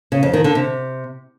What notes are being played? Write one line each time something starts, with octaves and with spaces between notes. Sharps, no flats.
C#3
F2
D#3
D3
C3